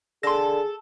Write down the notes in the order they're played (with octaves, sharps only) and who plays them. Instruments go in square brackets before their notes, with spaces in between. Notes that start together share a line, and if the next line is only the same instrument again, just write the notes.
[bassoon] D3 [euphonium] G#4 [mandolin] A4 [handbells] C6 A#6